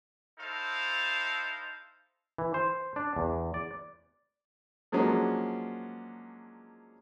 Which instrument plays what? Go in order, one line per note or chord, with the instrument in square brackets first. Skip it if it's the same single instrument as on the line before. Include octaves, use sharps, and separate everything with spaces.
[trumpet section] D#4 E4 A4 C5 F5
[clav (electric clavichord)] E3
C5
D4
E2
D5
[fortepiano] F3 F#3 G#3 A#3 C#4 D4